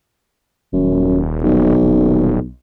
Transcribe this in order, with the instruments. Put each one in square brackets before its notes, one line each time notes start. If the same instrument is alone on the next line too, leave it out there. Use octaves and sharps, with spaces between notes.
[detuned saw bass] D#1 [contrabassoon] F#2
[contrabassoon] B1
[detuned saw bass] D#1